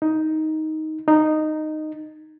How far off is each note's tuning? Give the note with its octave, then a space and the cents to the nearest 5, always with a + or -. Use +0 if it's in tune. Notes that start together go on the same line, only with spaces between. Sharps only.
D#4 +10
D#4 -10